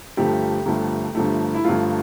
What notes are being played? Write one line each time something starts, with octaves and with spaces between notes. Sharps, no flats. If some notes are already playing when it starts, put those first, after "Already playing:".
G1 G2 F3 A3 G4
G1 G2 F3 A3
G1 G2 F3 A3
E4
G1 G2 F3 A3 F4